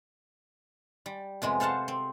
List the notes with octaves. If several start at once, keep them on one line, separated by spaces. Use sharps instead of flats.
G3
F2 C3 G#3 B3
A4 C5 F5 F#5 A5
C4